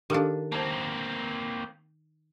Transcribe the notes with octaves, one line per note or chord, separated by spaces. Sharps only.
D#3 D4 G4 A4 F5
A#3 C4 C5 A5